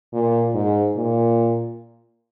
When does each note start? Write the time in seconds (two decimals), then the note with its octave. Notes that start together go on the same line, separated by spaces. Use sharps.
0.13 A#2
0.54 G#2
0.96 A#2